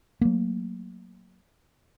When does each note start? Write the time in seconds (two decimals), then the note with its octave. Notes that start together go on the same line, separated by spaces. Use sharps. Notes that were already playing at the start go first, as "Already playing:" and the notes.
0.21 F#3 A3 A#3